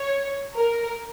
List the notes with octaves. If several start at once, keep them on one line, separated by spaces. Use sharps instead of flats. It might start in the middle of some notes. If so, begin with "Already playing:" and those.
Already playing: C#5
A#4